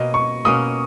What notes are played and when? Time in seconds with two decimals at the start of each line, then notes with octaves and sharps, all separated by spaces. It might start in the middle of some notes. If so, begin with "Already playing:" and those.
Already playing: B2 A#3 C#4 D#5
0.14 C#6
0.45 B2 A#3 C#4 D#6